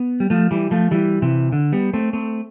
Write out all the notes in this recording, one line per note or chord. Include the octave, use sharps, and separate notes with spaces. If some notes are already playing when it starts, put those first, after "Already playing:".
Already playing: B3
G3
F3 A3
E3 G3
F3 A3
E3 G3
C3 E3
D3
G3 B3
A3 C4
A3 C4